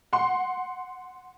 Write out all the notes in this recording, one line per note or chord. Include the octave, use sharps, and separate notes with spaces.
F#5 C6